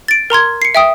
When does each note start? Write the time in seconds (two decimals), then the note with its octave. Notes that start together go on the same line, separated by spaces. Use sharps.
0.08 A6 D7
0.30 A#4 A#5 C6 G#6
0.62 C7 C#7
0.75 E5 G5 D#6